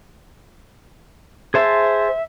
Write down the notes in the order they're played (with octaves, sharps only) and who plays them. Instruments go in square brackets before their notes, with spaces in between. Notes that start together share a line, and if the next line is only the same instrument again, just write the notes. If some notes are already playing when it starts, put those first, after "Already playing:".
[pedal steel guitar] G#4 C5 A5 [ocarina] E5